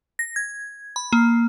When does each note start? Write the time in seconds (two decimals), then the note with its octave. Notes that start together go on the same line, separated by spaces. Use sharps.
0.19 A#6
0.36 G#6
0.96 B5
1.13 A#3